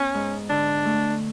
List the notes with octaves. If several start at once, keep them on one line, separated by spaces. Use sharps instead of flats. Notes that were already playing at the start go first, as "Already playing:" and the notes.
Already playing: B3 C#4
G#2
D3 D4
A3